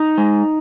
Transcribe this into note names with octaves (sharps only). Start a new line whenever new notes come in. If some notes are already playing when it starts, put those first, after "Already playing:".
Already playing: D#4
G#3